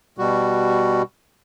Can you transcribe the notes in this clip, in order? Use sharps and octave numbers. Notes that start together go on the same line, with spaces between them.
B2 G3 F#4